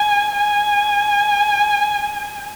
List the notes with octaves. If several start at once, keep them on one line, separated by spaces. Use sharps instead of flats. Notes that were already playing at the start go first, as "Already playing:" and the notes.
Already playing: G#5
G#5